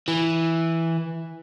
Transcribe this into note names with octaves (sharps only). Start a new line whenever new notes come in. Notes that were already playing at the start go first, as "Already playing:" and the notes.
E3